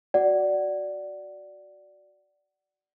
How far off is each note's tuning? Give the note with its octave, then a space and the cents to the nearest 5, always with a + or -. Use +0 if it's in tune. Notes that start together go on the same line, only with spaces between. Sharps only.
F#4 +0 D5 +0 F#5 +20